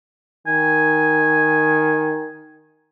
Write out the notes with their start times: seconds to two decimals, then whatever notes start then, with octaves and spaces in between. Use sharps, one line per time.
0.47 D#3 G#5